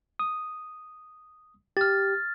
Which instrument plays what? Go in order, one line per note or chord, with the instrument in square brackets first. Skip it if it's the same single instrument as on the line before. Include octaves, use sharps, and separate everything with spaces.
[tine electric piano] D#6
[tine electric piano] G4 [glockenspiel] F6 A6